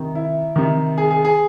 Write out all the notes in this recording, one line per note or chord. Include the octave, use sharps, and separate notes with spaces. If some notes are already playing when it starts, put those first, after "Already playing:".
Already playing: C3 D#3
E4
C3 D#3
G#4
G#4
G#4